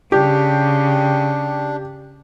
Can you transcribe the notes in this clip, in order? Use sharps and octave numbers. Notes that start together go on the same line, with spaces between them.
C#3 D4 G4